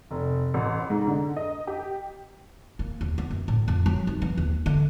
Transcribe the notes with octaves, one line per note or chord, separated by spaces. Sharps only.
F1
A1
G#2
D3
D#5
G4
A#3
D#2
B3
F#2
A2
F2
F#3
D#4
E3
D#2
D3